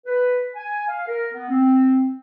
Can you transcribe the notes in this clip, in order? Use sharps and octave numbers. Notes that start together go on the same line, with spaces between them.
B4
G#5
F5
A#4
B3
C4